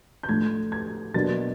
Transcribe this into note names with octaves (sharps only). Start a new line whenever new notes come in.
G6
A2 F3 A3 D4 G#6
G#6
B2 F#3 A#3 D4 A6